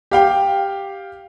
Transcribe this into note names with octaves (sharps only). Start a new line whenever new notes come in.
G4 F5 G5